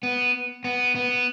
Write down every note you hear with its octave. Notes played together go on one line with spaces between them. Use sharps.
B3
B3
B3